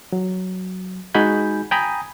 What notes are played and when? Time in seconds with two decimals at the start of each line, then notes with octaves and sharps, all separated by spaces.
0.12 F#3
1.14 G#3 D#4 F#4 G#5 B5 G6
1.71 G5 G#5 A#5 B5 D#6